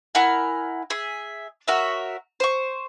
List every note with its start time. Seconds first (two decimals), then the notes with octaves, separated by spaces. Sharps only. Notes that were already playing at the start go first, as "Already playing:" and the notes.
0.15 E4 A#4 F#5 G#5
0.90 G#4 E5
1.68 F#4 A#4 C#5 E5
2.40 C5 C#6